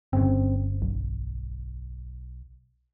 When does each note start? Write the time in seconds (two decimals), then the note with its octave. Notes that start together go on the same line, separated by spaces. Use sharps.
0.13 G1 C#3 C4
0.82 B1